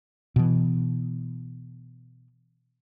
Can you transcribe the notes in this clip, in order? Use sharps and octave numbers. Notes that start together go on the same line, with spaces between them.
B2 E3